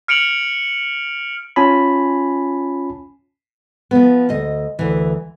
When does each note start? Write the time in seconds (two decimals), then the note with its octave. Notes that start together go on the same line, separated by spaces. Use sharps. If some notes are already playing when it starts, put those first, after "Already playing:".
0.08 F6 C#7 D7 F7 F#7
1.56 C#4 F4 G#5 A5 B5
3.91 F3 B3
4.29 D2 D#5
4.79 D2 E3